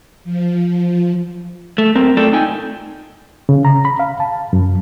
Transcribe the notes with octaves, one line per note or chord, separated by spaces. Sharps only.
F3
A3
F#2 C4 A#4
A2 A3 F4 A4 D5 G5
D#4 G5 G#5
C#3
A#5
B5
F5
A5
F#2